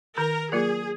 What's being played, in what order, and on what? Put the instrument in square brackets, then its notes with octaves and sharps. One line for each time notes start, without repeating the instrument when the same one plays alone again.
[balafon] D#3 [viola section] A#4
[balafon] F#3 A#3 F4 A#4 [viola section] G#4